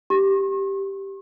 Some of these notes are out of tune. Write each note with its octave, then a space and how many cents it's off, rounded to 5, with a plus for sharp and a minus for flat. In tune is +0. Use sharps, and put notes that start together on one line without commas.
G4 +0 C#6 -45